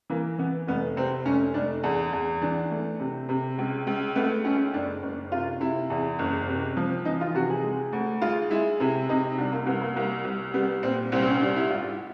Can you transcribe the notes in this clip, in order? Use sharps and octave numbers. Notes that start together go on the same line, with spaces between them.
E3 A#3
E3 B3
F1 B3
C3 C4
F1 C#4
F1 D4
E2
E2
E3 D4
A3
C3
C3
C#2
C#2
A3 B3
C#2 C#4
F#1 D4
F#1
C3 F4
C3 E4
E2
F#1
C3
F3
E3 D#4
F4
C3 F#4
G#4
G#3
D2
G#3 F4
G#3 E4
C3 E4
C3 D#4
C2 D4
A#3
C2 B3
A#3
C2 A#3
C2
G3 B3
A#2 C4
C2 C4
C4
C#4
G3 D4
E4
G#1 F4